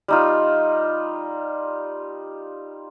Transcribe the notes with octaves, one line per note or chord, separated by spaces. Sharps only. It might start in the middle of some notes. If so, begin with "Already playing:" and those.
G3 D#4 F4